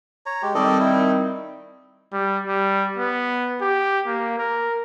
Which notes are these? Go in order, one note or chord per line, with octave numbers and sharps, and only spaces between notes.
C#5 A#5
G#3 G4
D#3 G3 C4 A4 D5 D#5
E4
G3
G3
B3
G4
A#3
A#4